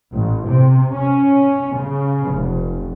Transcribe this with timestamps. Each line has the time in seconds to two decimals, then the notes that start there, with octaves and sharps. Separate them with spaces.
0.13 A1
0.48 C3
0.93 C#4
1.76 C#3
2.33 F1